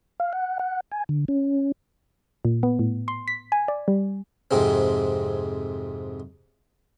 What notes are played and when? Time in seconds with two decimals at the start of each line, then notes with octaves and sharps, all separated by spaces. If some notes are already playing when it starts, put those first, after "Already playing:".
0.20 F5
0.33 F#5
0.59 F#5
0.92 G#5
1.09 D3
1.28 C#4
2.45 A#2
2.63 B3
2.79 A2
3.08 C6
3.28 B6
3.52 G#5
3.68 D5
3.88 G3
4.51 F2 G#2 C3 G#3 C4